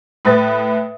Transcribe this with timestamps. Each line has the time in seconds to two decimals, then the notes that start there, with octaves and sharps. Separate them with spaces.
0.25 A2 B4 D#6 A6